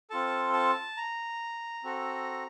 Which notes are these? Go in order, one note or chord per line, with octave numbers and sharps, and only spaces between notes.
C4 F4 A4 A5
A5
A#5
C4 F#4 A4